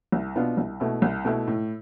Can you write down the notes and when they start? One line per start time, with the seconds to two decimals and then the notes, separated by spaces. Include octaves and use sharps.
0.12 C2
0.36 B2 B3 D4 F4
0.57 C2
0.80 B2 A3 E4
1.02 C2
1.25 B2 A3 E4
1.47 A2